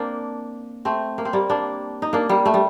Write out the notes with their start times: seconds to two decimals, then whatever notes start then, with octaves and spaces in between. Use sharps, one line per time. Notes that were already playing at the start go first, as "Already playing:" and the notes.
Already playing: A#3 C4 D4
0.85 A3 C4
1.18 A#3
1.25 C4
1.33 G3 A#3
1.50 A#3 D4
2.02 D#4
2.13 A#3 D4
2.29 G3 A#3
2.46 A3
2.54 G3